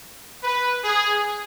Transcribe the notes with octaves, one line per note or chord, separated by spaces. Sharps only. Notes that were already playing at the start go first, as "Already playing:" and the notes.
B4
G#4